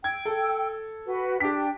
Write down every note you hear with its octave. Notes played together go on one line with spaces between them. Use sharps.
G5 E6 G#6
A4
F#4 B4
D4 G4 G5 B6